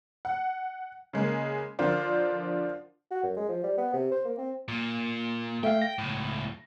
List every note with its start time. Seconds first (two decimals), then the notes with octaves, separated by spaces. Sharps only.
0.25 F#5
1.13 C#3 G#3 A#3
1.79 D3 F3 F4 A#4 C5 D5
3.11 F#4
3.23 F#2
3.37 G#3
3.48 F3
3.64 G3
3.78 B3
3.94 C3
4.12 C5
4.25 A#3
4.38 C4
4.68 A#2
5.63 A3 E5 F5 G5
5.82 A#6
5.98 C#2 A2